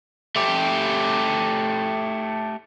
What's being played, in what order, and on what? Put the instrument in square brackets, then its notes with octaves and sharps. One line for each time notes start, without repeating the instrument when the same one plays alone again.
[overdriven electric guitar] A3 G4